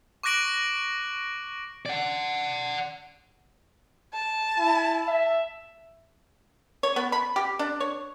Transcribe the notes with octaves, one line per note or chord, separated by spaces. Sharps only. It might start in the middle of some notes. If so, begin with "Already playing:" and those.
C#6 D6 F#6 A#6 D7 F#7
D5 F#5
A5
E4
E5
C#5
B3
B5
G4
D4
C#5